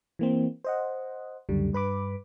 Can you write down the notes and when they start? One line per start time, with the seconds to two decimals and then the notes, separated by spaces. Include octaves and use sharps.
0.19 E3 A#3 C4
0.64 C5 D#5 F#5
1.49 C#2 F#2 D3 G3
1.73 G2 B4 B5 D6